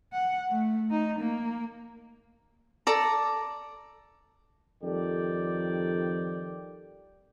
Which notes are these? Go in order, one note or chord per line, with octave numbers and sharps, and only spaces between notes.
F#5
A3
D#4
A#3
A4 D5 A#5
F2 D#3 G3 A4 D5 G5